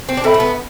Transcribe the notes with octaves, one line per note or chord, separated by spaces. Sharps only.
C4
D4
C4 A4 E5 B5
A3
B3